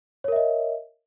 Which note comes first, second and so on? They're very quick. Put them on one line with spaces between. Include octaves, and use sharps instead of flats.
C#5 A#4 E5 D#5